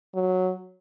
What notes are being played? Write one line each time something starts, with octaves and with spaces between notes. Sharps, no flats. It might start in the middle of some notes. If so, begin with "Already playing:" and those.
F#3